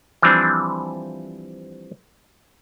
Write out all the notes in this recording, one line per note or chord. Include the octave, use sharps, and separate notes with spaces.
E3 F3 G3 C4 D4